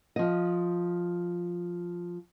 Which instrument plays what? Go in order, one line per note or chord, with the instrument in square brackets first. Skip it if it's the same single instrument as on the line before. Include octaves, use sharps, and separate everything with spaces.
[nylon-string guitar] F3 D#5